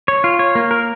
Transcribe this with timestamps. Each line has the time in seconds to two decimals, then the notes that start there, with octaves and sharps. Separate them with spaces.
0.08 C#5
0.24 F4
0.39 C#5
0.55 A#3
0.71 A#4